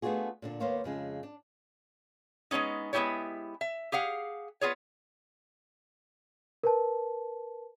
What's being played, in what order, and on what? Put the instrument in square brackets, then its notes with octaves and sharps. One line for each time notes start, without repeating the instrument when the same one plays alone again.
[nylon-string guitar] A3 B3 D4 F4 F#4 G#4
A#2 D3 D4
D#2 A#3 B3 C5 C#5 F5
F2 C#3 G#3
D4
[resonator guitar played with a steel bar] G#3 A3 B3 C#4 D#4
G#3 B3 C#4 E4 G4 C#5
E5
G4 G#4 F5 F#5
B3 F4 G#4 C#5
[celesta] A#4 B4 A5